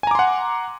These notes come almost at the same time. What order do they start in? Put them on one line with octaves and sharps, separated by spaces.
G#5 A#5 D6 C6 F#5